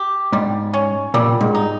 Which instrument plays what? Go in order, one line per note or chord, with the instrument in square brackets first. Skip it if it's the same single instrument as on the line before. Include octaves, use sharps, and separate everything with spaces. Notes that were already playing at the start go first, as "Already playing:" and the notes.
Already playing: [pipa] G4
[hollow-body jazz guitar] G#2 [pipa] G3
[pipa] C#4
[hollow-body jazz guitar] A#2 [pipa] G3
[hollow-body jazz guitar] G#2
[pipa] D#4